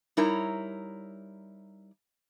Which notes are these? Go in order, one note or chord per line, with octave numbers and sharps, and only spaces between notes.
G3 D#4 E4 A#4 C#5 A#5